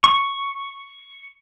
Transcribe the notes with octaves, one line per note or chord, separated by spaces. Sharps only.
C#6